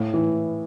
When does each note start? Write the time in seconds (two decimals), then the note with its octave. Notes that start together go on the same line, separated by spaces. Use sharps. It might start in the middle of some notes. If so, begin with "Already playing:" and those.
Already playing: A2 A3
0.14 E3